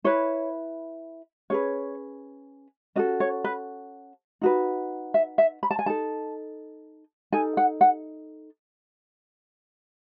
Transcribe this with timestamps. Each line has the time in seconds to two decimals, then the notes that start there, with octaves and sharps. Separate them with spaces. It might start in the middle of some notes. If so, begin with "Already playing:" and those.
0.04 E4 B4 C#5
1.50 C#4 G#4 B4 C#5
2.96 C#4 F#4 A4 D#5
3.20 C#5
3.44 B4
4.41 D#4 F#4 B4
5.14 E5
5.38 E5
5.63 B5
5.71 A5
5.79 G#5
5.86 D#4 A4 A5
7.32 D#4 A4 G#5
7.57 F#5
7.81 F#5